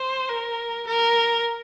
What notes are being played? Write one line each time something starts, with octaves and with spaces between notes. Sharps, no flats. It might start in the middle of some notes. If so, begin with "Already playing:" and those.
Already playing: C5
A#4
A#4